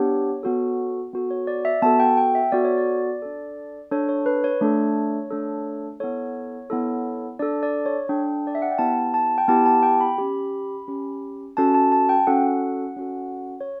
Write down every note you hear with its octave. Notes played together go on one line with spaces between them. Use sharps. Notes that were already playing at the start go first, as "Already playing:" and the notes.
Already playing: B3 D4 G4 C#5
B3 F#4 A4
B3 F#4 A4
C#5
D5
E5
B3 F#4 A4 A5
G5
G5
E5
B3 F#4 A4 D5
C#5
D5
D4 A4
D4 A4 C#5
C#5
B4
C#5
A3 D4 A4
A3 D4 A4
B3 E4 A4 C#5
B3 E4 A4
D4 A4 D5
D5
C#5
D4 A4 G5
D5
E5
F#5
G5
B3 E4 G4 A5
A5
G5
B3 E4 G4 A5
A5
G5
B5
C#4 G4
C#4 G4
C#4 F#4 A4 A5
A5
A5
G5
C#4 F#4 A4 F#5
C#4 F#4 A4
C#5